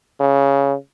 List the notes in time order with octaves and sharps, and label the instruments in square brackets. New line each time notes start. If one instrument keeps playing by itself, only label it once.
[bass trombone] C#3